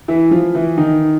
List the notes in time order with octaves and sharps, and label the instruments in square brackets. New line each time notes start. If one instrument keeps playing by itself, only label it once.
[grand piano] E3 E4
F3 F4
E3 E4
D#3 D#4